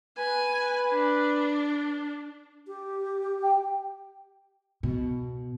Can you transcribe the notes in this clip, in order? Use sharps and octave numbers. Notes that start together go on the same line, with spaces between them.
B4 G#5
D4
G4
G5
B2